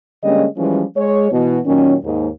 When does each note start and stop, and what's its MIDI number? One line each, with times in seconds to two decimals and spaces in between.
0.24 0.45 50
0.24 0.45 55
0.24 0.45 56
0.24 0.45 58
0.24 0.45 61
0.24 0.45 75
0.57 0.83 52
0.57 0.83 53
0.57 0.83 55
0.57 0.83 56
0.57 0.83 61
0.97 1.29 56
0.97 1.29 73
1.32 1.59 47
1.32 1.59 52
1.65 1.95 46
1.65 1.95 51
1.65 1.95 54
1.65 1.95 61
2.05 2.27 39
2.05 2.27 44